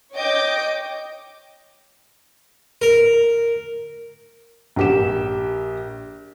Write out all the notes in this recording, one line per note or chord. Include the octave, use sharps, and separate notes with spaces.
C#5 D#5 G5 D6 G6
A#4
A#1 G4 E7